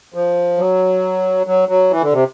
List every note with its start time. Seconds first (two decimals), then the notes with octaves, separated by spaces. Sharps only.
0.14 F3
0.58 F#3
1.47 F#3
1.69 F#3
1.91 E3
2.02 D3
2.13 C3